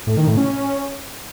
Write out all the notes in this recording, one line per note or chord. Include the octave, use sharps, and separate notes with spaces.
A2
D#3
A2
C#4